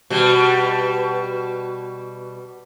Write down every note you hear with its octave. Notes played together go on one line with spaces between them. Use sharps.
B2 G3